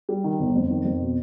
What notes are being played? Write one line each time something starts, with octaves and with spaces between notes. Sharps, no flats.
G3
D#3
G1
F2
D#3
F2
B2